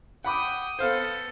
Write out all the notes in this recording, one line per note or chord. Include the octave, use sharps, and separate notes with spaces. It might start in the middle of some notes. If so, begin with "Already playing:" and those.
F#5 G5 B5 D6 D#6
B3 A4 C5 F5